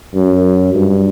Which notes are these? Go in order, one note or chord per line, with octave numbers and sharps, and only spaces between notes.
F#2
G2